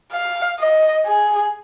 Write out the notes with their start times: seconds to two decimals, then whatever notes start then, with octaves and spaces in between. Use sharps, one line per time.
0.12 F5
0.60 D#5
1.06 G#4